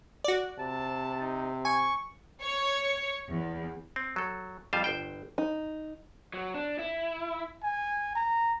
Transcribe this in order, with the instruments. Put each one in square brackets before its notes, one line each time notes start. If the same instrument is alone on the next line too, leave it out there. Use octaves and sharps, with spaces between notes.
[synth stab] F#4 D5
[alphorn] C3 [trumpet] A5
[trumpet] D#4
[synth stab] G#5 [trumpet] C#6
[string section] C#5
E2
[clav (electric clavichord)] C4
F#3 A4
F2 G3 F4 C5 F5
G1 C5 G5
[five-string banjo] D#4
[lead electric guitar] F#3
D4
E4
[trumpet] G#5
A#5